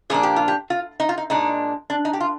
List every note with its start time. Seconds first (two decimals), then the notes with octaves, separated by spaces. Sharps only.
0.10 A#2 F3 A#3 D4 G#4
0.23 G4
0.36 F4
0.48 G4
0.70 F4
1.00 D#4
1.09 F4
1.18 D#4
1.30 A#2 G#3 D4 D#4
1.90 D4
2.05 D#4
2.13 G4
2.20 F4